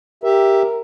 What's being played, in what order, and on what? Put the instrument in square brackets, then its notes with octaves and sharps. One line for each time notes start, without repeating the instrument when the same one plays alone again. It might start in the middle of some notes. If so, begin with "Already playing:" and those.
[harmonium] G4 E5 [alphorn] A#4